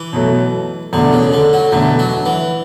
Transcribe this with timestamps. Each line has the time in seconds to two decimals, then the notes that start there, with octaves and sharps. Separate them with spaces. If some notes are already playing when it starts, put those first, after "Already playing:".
Already playing: E3
0.13 B2 F#3 A3
0.93 E2 B2 D3 A3 D4
1.13 C#3
1.33 D3
1.53 F#3
1.72 E2 B2 D3 A3 D4
1.99 F#3
2.26 E3